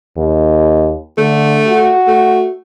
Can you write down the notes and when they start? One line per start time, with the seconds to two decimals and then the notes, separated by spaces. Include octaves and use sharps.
0.17 D#2
1.18 D3 A3
1.67 F#4
2.07 A3